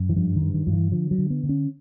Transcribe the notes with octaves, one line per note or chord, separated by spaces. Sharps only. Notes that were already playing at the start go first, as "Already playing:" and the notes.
Already playing: F#2
E3
G2 F3
D#3
G2
D#3
G2 F3
E3
D3 F3
F#3
D3
B3
D3
C#4